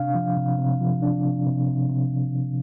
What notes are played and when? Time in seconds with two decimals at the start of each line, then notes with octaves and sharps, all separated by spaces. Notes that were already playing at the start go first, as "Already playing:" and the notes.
Already playing: C3 D4 F5
0.15 F3
0.37 C3
0.59 C3
0.81 F3
1.03 D4
1.24 C3
1.46 C3
1.68 C3
1.90 C3